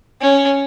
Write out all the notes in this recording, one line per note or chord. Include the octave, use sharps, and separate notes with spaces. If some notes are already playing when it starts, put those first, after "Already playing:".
C#4